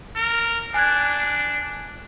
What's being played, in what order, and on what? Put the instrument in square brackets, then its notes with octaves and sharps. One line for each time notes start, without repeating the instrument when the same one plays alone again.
[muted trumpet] A#4
[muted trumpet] D4 [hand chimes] G#5 F#6 G#6